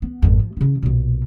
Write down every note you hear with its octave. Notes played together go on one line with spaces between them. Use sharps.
B3
G#1 F2
F3
C#3 E4
B1 A#2